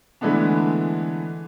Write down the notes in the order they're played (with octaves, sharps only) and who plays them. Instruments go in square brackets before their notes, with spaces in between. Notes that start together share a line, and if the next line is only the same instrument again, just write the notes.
[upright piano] D3 E3 G#3 A3 B3 D4